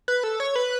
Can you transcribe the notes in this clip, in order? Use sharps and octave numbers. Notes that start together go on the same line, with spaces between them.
B4
A4
C#5
B4